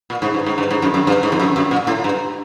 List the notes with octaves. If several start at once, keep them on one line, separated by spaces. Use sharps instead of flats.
A#2
G#2
G2
G#2
G2
G#2
F#2
F#2
G2
G#2
F2
F#2
F#2
A#2
A2
G2